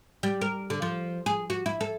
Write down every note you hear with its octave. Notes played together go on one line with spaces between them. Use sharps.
G3
A#4
D3
F3
G#4
F#4
E4
A4